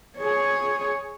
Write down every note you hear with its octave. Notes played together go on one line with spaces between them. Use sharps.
G#4 C#5